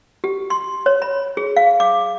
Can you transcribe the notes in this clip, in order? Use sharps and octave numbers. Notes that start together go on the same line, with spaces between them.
G4
C6
C#5
B5
G#4
F5
D6